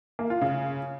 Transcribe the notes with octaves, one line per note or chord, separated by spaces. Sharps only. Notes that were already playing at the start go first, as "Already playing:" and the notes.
A#3
F4
C#3